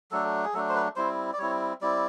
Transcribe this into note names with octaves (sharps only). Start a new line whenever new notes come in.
F#3 A3 D4 A4
G#4
F#3 A3 D4 A4
C5
B4
G3 C4 E4 C5
D5
G3 C4 E4 C#5
G3 C4 E4 D5